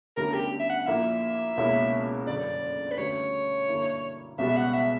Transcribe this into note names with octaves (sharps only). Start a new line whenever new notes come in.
D2 C#3 G3 B3 D4 A#4
G4
E5
F#5
A#1 A#2 A#3 E4 E5
C#2 B2 A#3 C#4 E4
G1 F#2 C#3 D5
B4
D2 C#3 G3 C#5
G2 D3 A#3 E4
C#2 B2 G3 B3 E5
E5
F#5
E5